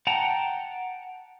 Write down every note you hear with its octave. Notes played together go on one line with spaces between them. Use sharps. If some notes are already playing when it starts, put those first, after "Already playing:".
F#5 G5 A5 A#5